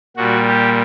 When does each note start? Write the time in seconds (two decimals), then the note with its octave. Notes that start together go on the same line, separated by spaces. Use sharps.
0.16 A#2 G3 F#4
0.48 G4